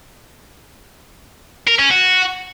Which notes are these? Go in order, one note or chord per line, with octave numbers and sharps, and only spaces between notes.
A#4
C#4
F#4